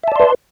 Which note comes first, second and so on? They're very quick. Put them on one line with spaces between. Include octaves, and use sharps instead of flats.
E5 A5 D5 C6 B4